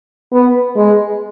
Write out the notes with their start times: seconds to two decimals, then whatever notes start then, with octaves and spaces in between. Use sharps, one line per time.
0.33 B3
0.76 G#3